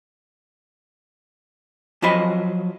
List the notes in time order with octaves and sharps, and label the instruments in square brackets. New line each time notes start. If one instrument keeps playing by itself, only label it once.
[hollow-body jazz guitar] F3 F#3 F4 C5 D#5 B5